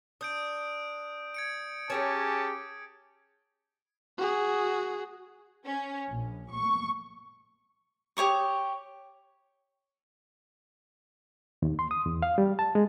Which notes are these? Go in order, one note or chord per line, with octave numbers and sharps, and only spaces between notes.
D4 D#6 G6 D7
G#6 C#7 D7
C#4 G4 G#4 A#4 C#5 A5
F#4 G#4
C#4
A#1
C#6
G4 C#5 C#6 D#6
D#2
C6
D#6
E2
F5
G3
A5
G#3